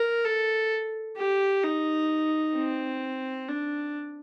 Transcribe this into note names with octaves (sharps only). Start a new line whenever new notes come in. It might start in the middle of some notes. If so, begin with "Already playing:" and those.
Already playing: A#4
A4
G4
D#4
C4
D4